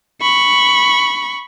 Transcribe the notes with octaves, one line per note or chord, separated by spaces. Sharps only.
B5 C#6